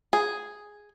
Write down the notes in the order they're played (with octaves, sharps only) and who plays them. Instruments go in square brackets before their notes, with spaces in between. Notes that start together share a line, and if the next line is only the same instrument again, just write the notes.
[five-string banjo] G#4